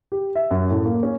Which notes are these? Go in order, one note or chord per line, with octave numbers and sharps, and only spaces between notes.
G4
E5
F#2
A2
A#3
C#4